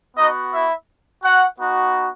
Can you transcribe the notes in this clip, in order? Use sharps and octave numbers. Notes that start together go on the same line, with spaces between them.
B3 D#4 F#4 D#5
E4 E5
F#4 F#5
B3 D#4 F#4